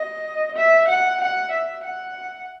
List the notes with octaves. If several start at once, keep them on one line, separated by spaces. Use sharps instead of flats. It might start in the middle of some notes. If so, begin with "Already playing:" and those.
Already playing: D#5
E5
F#5
F#5
E5
F#5